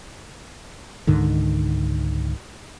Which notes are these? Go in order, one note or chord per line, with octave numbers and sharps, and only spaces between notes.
C#2 G#2 D3 D#3